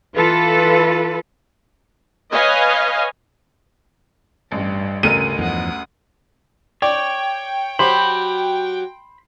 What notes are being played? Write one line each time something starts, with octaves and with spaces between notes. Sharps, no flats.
E3 F4 A4 B4
B4 C#5 D#5 F5 G#5
A1 G2
A1 D2 C#3 A#4 D#7
E2 G2 F3 F#5 D#6
C#5 D5 G5
F#3 G4 C5 B5